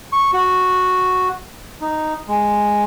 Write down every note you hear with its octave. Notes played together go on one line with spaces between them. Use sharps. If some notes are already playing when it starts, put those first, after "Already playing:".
C#6
F#4
D#4
G#3